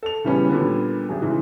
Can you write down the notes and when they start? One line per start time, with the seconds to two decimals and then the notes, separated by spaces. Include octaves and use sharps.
0.03 A4 F7
0.24 C#3 E3 G3 B3 C#4
0.49 A#2 D3 G3 B3
1.09 A1 F#3 G#4
1.22 G#2 C#3 E3